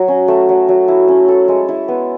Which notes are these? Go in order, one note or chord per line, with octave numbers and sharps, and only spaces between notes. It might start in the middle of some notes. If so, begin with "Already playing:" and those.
Already playing: F#3
C#4
A3
F#3
F#3
E4
C#4
A4
G#3
E4
B3